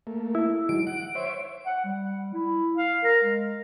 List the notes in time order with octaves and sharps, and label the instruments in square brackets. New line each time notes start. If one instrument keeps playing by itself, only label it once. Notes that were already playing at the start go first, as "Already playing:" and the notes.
[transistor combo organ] A3 A#3
[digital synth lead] E4
[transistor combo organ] D#3 F#3 G#3 [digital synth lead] D7
[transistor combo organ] F#5 [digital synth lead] D7
[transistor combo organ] C5 C#5 E5
[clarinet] F#5
G3
E4
F5
A#4
G#3